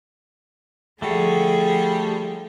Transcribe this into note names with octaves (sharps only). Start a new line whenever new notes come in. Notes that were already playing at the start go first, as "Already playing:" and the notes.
D3 F3 G3 A3 F#4 G#4